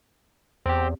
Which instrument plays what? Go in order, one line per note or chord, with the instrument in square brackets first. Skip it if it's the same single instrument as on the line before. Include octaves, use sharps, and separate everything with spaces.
[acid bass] E2 [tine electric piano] C4 G4